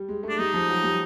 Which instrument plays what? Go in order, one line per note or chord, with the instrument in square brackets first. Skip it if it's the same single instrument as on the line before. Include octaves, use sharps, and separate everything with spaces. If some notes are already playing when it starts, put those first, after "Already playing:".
Already playing: [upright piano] G3
G#3
A3
[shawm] D4
[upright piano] G3 [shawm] D#4
[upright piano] F3
F#3
G3